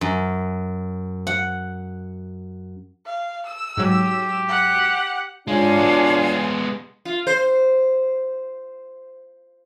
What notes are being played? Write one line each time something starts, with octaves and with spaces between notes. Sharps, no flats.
F#2
F#5
F5
E6
G#2 F#3 G4
F#5
G#2 G#3 D4 F4 C#5 F5 G#5
G#3 B3
F4
C5